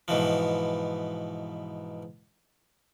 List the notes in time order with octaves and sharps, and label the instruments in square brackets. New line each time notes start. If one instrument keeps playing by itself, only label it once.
[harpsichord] G#2 B2 E3 F3